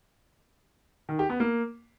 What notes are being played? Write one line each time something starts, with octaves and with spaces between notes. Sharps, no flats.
D#3
G4
B3
A#3